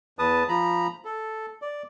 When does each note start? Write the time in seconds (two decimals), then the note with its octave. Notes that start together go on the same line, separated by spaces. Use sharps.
0.19 E2 B4 A5 D#6
0.49 F3 A#5 B5
1.05 A4
1.62 D5